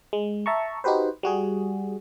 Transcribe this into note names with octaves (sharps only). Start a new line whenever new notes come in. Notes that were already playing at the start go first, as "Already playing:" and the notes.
G#3
E5 A5 A#5 C#6
D#4 F#4 G4 B4 C5
G3 F#4 G#4